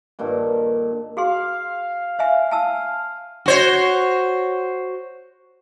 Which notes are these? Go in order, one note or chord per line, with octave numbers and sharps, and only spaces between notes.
G2 A#2 D#3 A4
F#4 G#4 F5 C6
C5 E5 G#5
G#5 A5 E6
F#4 C5 C#5